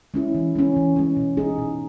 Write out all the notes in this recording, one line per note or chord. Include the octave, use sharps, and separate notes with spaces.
G#3 C#4 E4
E3
G#3 C#4
E3
G#3 C#4
B2
G#3 D#4 G#4
B2